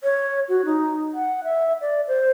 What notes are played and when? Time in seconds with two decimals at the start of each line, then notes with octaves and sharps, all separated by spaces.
0.03 C#5
0.49 F#4
0.65 D#4
1.14 F#5
1.44 E5
1.82 D5
2.08 C5